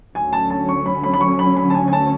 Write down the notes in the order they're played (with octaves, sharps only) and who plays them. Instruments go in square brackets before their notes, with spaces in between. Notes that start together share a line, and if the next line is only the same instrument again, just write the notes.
[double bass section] D2 D3 F#3 C#4 [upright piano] G#5
[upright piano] A5
A5
C#6
B5
B5
B5
C#6
B5
B5
A5
G#5
G#5
A5